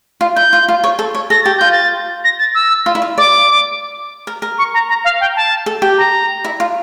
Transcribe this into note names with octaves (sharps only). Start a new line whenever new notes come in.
F4
E4 G6
F4
F4
C#5
A4
C#5
A4 A#6
G4 A6
F4 G6
A6
A#6
A6
E6
F4
E4
F4
D5 D6
A#4
A#4
C#6
A#5
A#5
F5
G5
A5
A4
G4
A#5
E4
F4